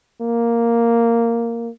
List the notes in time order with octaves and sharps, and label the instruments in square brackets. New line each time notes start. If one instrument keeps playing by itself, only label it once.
[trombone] A#3